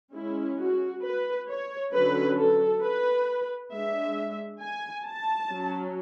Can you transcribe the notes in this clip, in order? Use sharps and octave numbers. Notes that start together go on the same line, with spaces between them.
G#3 C#4 E4
F#4
B4
C#5
D3 F#3 C#4 B4
A4
B4
G#3 D4 E5
G#5
A5
F#3 C#4